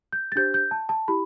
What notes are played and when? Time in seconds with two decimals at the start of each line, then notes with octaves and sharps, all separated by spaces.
0.13 G6
0.32 A6
0.36 D4 G4 C5 G6
0.54 G6
0.71 A5
0.89 A5
1.08 E4 G4 B5